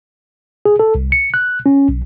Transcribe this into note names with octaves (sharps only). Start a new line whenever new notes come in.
G#4
A4
C2
C#7
F#6
C#4
B1